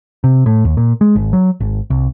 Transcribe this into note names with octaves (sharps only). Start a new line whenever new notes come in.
C3
A2
D#2
A#2
G#3
G#1
F#3
G#1
C2